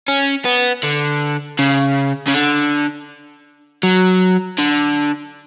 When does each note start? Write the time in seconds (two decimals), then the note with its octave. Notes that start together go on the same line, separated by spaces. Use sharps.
0.08 C#4
0.45 B3
0.83 D3
1.59 C#3
2.27 C#3
2.33 D3
3.83 F#3
4.58 D3